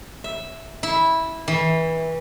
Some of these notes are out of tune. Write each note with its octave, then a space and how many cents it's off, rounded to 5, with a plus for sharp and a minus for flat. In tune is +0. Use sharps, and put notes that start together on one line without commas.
E5 -5
E4 -15
E3 -25